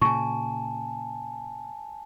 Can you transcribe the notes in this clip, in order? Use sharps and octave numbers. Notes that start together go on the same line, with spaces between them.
A#2 C#3 G#5 A5 C#6